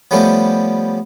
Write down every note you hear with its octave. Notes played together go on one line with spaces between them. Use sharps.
F3 G3 A3 B3 C#4 D4